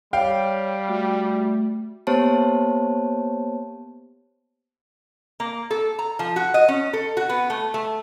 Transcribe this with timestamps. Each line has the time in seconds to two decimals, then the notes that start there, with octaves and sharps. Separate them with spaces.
0.13 G3 C#5 F5 G5
0.89 A3 F#4
2.07 A#3 B3 G4 C5 C#5 A5
5.40 A#3
5.71 A4
5.99 A#5
6.19 F3
6.36 F#4
6.54 D#5
6.68 C#4
6.93 A4
7.17 F#4
7.29 B3
7.50 A3
7.74 A3